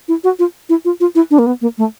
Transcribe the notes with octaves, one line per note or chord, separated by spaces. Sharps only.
E4
F#4
F4
E4
F4
F4
E4
D4
A#3
B3
A#3
A3